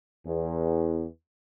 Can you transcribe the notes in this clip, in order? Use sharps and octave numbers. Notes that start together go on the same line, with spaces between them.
E2